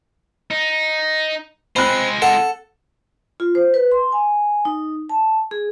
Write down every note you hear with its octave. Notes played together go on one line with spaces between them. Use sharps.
D#4
G#3 C4 F4 B5 F#6
A4 F#5
F4
C5
B4
C6
G#5
D#4
A5
G#4